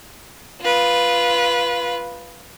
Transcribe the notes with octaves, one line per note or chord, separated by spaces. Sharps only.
F4 B4